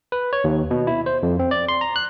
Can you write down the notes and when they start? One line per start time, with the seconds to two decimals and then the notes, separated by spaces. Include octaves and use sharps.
0.12 B4
0.33 C#5
0.44 D#2
0.71 B2
0.87 E4
1.06 C5
1.23 F2
1.39 C4
1.51 D5
1.69 C6
1.81 A#5
1.96 F#6